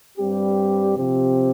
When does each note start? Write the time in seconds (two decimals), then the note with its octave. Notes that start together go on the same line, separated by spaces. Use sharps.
0.17 G2 G3 C4 G4
0.96 C3 F3 C4 G4